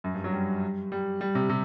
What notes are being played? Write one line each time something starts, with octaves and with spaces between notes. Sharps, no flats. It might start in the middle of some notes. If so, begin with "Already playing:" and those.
F#2
G2
F#3
G3
G3
G3
C3
C3